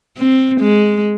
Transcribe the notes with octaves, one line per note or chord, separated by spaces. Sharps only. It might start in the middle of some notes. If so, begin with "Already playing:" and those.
C4
G#3